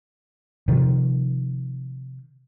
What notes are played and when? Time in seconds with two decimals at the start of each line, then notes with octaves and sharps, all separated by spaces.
0.68 C3 D#3 F3